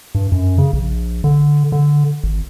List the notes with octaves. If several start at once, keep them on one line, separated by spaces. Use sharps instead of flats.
G2
F#2
C#3
A#1
D3
D3
G#1